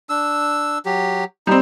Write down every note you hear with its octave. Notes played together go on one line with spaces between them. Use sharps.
D4 E6
F#3 G4
G3 C4 D#4